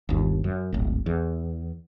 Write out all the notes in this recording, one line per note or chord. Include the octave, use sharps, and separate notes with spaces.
G1 D#2
F#2
D1 G#1
E2